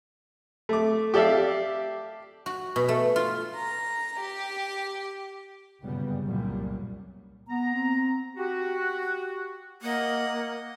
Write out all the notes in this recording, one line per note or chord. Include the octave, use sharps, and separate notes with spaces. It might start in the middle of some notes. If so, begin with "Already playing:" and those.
A3 D6
G4 A4 D5 E5 F5
F#4
B2
A3
F4
A#5
G4
G1 F#2 A#2 C#3 G3 B3
C2 F#2 A#2 G3
B3 A#5
C4
F#4 G4
A#3 D#5 F#5